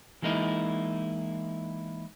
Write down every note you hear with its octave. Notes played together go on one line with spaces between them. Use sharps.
E3 G#3 A#3 D#4 E4